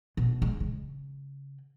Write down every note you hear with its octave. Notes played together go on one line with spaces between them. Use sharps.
B2
G#3
C#3